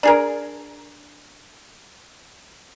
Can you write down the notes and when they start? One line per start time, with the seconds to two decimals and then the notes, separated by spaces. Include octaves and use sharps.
0.03 D4 G#4 A#4